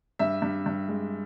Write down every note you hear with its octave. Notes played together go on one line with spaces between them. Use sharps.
G2 E5
G2
G2
G#3